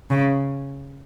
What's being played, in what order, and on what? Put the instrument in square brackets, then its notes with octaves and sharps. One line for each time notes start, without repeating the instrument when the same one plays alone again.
[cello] C#3